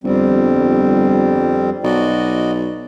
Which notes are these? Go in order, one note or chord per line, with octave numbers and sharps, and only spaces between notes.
G1 F2 G3 C4
B1 F#4 D5 D#5